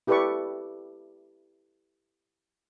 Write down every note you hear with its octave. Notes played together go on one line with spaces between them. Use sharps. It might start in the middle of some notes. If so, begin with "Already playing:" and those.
E4 G4 A4 B4 D5 C#6